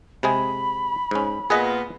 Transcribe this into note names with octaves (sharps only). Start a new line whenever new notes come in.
C3 G#3 G#4 B5
G#2 C#4
A#2 B3 G#4 B4 D#5